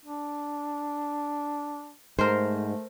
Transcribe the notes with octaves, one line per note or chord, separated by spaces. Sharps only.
D4
G#2 A3 A#4 C5